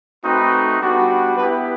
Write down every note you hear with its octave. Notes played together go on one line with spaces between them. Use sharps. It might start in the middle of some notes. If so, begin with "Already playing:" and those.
A3 C4 D#4 F#4 B4
G3 B3 D4 F#4
B3 E4 G4 B4